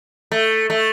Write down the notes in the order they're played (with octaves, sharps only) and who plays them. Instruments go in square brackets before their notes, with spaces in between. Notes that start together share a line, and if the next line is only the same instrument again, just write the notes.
[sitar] A3
A3